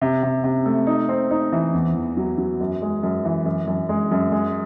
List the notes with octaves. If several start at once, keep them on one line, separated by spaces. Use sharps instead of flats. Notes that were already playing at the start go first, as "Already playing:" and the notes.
C3
C3
C3
A3
D#4
C4
D#4
E3
E2
E2
F#3
F#3
F#2
G#3
F#2
E3
F#2
F#2
G#3
F#2
G#3